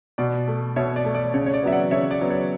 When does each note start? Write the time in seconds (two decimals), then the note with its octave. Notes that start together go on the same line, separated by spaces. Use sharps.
0.18 B2 D5
0.48 A3
0.76 B2 C#5 E5
0.96 D5
1.05 A3
1.15 D5
1.34 C#3 C#5
1.46 C#5
1.54 D5
1.63 F#3 B3 E5
1.72 D5 F#5
1.91 C#3 C#5 E5
2.11 D5
2.21 F#3 B3
2.30 C#5